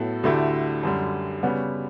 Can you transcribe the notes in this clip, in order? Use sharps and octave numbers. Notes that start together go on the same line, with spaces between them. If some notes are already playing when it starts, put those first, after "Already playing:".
Already playing: A2 F#3 B3 A4
D2 D3 A3 E4 G4
F#2 D3 G3
C#3 G3 B3 F#4